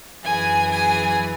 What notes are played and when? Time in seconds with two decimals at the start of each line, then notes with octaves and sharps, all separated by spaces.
0.23 F#2 E3 G#4 G#5
0.70 G#4 G#5